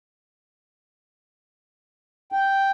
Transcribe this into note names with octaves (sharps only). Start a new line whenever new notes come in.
G5